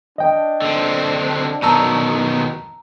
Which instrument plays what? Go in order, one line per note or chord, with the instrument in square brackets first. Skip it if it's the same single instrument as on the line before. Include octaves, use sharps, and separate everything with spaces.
[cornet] D4 [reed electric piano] D#5 G5
[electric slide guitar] D3 C4
[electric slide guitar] B2 D#3 F#3 [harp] A5 A#5 E6